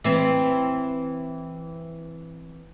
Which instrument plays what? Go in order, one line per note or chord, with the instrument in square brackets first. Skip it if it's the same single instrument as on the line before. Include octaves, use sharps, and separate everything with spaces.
[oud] E3 C4